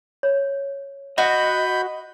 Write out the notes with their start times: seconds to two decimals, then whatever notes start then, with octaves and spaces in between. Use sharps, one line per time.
0.23 C#5
1.18 F#4 D#5 B5 G6